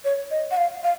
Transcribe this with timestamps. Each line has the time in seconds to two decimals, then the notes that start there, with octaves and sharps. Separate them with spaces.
0.04 C#5
0.31 D#5
0.51 F#5
0.57 F5
0.83 F5